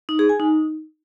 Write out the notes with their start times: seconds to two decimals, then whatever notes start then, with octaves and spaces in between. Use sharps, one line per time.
0.09 D#4
0.19 G#4
0.29 G#5
0.40 D#4